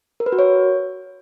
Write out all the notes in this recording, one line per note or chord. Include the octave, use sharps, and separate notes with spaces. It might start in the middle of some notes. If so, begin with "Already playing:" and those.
A#4
B4
F#4
C#5